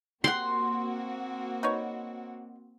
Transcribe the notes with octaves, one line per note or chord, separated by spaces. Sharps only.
A#3 C4 F#4 G4 F#5 C6
D#4 B4 C#5